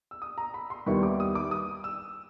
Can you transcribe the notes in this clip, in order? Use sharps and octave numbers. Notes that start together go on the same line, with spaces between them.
E6
D#6
A#5
B5
C6
D#2 D#3 G3 B3 E4 C#6
D6
D#6
D6
D#6
E6